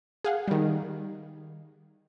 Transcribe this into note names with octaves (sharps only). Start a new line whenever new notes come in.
G#4 F5 F#5
D#3 G3